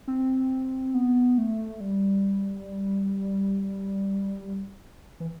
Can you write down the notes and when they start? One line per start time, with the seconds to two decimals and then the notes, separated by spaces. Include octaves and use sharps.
0.07 C4
0.94 B3
1.38 A3
1.81 G3
5.20 E3